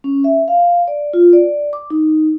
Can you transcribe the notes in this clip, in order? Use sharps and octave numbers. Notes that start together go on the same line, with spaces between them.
C#4
E5
F5
D5
F4
D5
D6
D#4